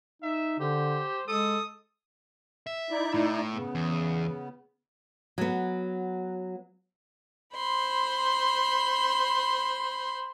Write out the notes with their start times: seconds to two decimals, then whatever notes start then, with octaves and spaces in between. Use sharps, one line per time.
0.22 D#4 E5
0.60 D3 G4 C5
1.28 G#3 A4 D#6
2.67 E5
2.91 D#4 E4 D5
3.14 A2
3.53 C#3 B3
3.75 E2
5.38 F#3 B3
7.55 C5 B5 C6